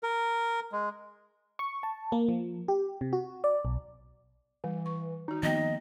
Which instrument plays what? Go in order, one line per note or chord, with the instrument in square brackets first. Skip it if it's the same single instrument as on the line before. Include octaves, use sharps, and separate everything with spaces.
[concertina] A#4
G#3
[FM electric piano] C#6
A5
A#3
F3
G4
C3
F#4
D5
B1
[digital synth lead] E3 [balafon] G3
[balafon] C#6
[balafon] D#3 F#4 [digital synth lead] D#4
[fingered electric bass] D#3 F3 A#3 [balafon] B3 F#4 G5 [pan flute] D#5